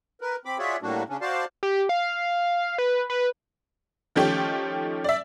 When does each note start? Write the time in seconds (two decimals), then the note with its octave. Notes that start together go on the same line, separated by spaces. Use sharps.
0.21 A#4 B4
0.45 C4 B5 D6
0.59 F4 F#4 G#4 C#5 D5 E5
0.83 A2 G3 A#3 D4 F#4
1.09 C#3 C#4 D4
1.21 F#4 C5 D5 F5 A5
1.63 G4
1.89 F5
2.78 B4
3.10 B4
4.16 D#3 F3 A3 C#4 G4
5.04 D5 E5